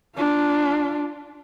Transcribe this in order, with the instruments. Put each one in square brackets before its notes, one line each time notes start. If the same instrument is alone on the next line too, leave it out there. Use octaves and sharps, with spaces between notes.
[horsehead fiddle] D4 F4